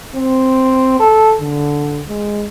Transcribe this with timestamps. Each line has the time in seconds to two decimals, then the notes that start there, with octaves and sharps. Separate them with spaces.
0.15 C4
1.00 A4
1.40 D3
2.09 G#3